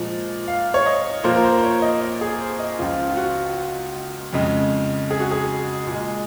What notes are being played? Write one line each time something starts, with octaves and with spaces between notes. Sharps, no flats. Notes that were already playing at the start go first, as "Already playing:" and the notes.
Already playing: A#2 F3 G#3
F5
C#5
D#5
A#2 F3 A#3 C5
A#4
C5
C5
C#5
D#5
D#5
G#4
C5
D#5
C#2 C#3 F3 F4
F4
F#4
F2 C#3 G#3
G#4
F#4
G#4
A#2 G#3